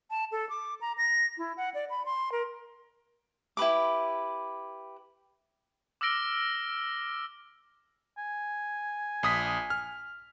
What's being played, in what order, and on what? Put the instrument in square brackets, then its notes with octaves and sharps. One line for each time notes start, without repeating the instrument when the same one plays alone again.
[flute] A5
A4
D6
A#5
A#6
E4
F#5
D5
B5
C6
A#4
[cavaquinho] E4 G4 B4 D6
[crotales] D6 E6 F6 A#6 D7 G7
[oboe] G#5
[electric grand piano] A#1 D#6 B6
F6